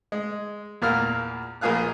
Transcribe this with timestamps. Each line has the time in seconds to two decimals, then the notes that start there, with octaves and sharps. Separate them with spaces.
0.12 G#3
0.82 E2 A#2 A#4 F5 F6
1.61 A#1 A#3 F4 G#4 F5 F#6